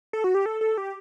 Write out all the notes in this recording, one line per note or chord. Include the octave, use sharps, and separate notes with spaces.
A4
F#4
G4
A4
A4
G4